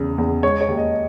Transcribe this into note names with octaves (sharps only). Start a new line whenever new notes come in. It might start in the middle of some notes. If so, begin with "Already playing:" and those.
Already playing: E2 C#3
E2
G#3 C#5
C#5
D#2
D#5